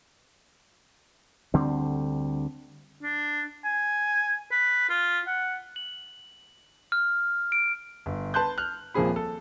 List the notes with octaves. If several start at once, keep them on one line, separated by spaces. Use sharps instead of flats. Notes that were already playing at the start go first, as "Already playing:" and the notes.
D2 D3 G3 C4
D4
G#5
B4
F4
F#5
F#7
F6
D7
G1
B4 A5 C6 F#6 G6
F6 F#6
D#1 F3 A#3 C4 G#4 B5
A4